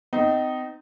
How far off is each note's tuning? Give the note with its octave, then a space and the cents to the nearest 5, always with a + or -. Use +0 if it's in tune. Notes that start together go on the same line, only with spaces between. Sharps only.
C4 -35 D#4 +0